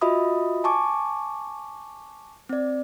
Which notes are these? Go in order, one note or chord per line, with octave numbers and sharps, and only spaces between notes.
F4 F#4 D#5 E5 B5 D#6
G#5 A5 C#6 D6
C4 D5